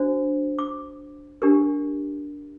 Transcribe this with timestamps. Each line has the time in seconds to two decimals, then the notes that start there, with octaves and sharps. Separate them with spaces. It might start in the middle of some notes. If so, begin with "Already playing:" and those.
Already playing: D4 F#4 C5
0.59 D6
1.42 D4 G4 A#4